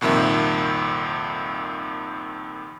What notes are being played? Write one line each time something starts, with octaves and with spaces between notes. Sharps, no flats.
C2 F2 A#2 D#3 E5